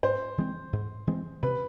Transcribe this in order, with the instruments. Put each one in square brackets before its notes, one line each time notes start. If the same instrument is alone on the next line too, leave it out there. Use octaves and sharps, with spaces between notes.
[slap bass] G#2 [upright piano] C5
[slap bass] E3 G#3 C4
G#2
E3 G#3 C4
[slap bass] C3 [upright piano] B4